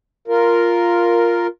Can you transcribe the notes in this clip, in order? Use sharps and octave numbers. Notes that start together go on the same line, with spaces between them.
F4 A#4